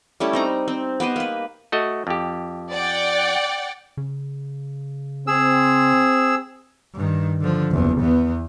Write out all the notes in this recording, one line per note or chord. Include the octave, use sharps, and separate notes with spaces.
G3 A3 C#4 E4
C4 D#4 A#5
C4
B3 G4 C5 D#5
A#3 B4
A3 F#4 D#5
F2 G4
D5 F#5 G5
C#3
C4 G#4 E6
G2 D#3
D3 F3
F#1 E2
E2 B3